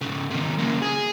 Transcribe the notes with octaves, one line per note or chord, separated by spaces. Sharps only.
G#2 C#3
C3 D#3
C#3 A#3
G#4